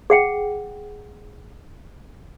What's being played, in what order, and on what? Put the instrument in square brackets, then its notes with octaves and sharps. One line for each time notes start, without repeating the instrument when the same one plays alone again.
[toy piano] G#4 F#5 G5